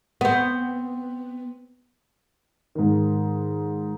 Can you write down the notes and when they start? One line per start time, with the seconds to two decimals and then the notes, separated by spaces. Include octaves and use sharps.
0.21 B3 C4
2.75 G#2 D#3